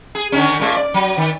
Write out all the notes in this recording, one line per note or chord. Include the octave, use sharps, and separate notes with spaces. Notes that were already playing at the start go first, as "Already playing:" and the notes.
G#4
D3 D#3 C#4
A#2 G#3
D5
F#3
D#3